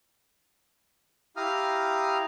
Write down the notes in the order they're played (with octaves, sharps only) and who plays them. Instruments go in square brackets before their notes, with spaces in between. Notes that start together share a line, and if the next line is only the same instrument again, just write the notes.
[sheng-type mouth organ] E4 G4 F5 A#5 D#6 F6